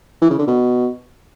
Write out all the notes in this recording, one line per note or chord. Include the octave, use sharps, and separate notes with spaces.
E3
C#3
D3
B2